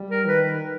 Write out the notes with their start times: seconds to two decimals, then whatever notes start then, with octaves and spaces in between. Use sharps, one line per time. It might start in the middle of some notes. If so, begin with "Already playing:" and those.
Already playing: G3
0.11 A#4
0.27 D#3 B4